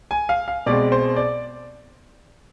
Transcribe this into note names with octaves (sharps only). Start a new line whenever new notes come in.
G#5
F5
F5
B2 G#3 C4 D5
C5
D5